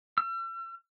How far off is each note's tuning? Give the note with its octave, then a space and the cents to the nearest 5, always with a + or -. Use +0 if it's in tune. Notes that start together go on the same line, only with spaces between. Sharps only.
E6 +45